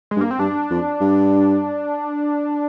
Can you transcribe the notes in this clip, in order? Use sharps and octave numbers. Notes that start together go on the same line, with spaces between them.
G#3
G2
A#3
C4
G2 D4
F2
G2